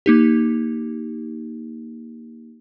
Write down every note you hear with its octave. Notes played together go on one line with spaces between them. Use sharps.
A#3 D#4 G4